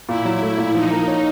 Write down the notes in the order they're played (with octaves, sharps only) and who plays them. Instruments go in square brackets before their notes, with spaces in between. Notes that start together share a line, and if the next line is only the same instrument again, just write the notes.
[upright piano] A#2 [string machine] E4
[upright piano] F#3
[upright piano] A3 [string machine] E4
[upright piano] A#2
[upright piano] F3 [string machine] D#4
[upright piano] A#3
C#4